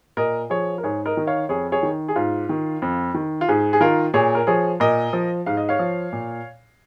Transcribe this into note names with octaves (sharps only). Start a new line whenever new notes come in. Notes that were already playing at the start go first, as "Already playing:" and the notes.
A#2 A#4 D#5
F3 G#4 C#5
A#4
G#2 G#4 C#5
A#4 D#5
D#3
C#5 F5
F2 G#4 C#5
G#4 C#5
D#3
G#4
G#2 F4
D#3
F2
D#3
F4
G#2 G#4
G#4
D#3 F4 A#4
A#2 G#4 C#5
A#4
F3 G#4 C#5
A#2 A#4 D#5
F3
G#2 F5
D#5
C#5 F5
F3
A#2